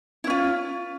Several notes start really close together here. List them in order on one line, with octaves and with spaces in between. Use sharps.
E4 C#4 F4